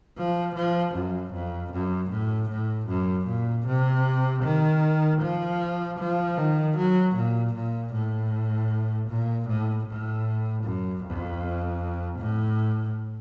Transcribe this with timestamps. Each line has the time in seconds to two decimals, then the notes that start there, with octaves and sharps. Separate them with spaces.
0.17 F3
0.55 F3
0.95 F#2
1.34 F2
1.73 F#2
2.10 A2
2.50 A2
2.88 F#2
3.27 A#2
3.66 C3
4.43 D#3
5.21 F3
5.99 F3
6.37 D#3
6.77 F#3
7.15 A#2
7.53 A#2
7.93 A2
9.08 A#2
9.48 A2
9.86 A2
10.64 F#2
11.04 F2
12.19 A2